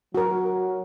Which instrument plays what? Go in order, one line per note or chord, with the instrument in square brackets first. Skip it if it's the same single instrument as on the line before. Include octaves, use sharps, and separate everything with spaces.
[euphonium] F#3 [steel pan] F#4 A#4